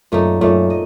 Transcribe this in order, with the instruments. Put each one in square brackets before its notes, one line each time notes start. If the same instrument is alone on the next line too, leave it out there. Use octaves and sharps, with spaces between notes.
[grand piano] F#2 [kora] A#2 A3 D#4
[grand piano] F#2 [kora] A#2 A3 D#4
[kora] D#5